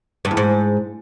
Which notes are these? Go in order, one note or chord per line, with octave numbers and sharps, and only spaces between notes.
G2
E2
G#2